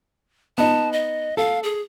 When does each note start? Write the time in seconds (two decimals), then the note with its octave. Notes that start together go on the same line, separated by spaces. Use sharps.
0.58 B3 D#4 A5
0.93 D#5
1.37 A4 F5
1.63 G#4